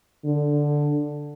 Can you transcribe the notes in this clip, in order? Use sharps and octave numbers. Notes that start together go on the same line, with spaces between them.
D3